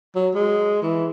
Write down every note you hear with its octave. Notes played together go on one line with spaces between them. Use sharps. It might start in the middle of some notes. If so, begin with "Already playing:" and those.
F#3
G#3
E3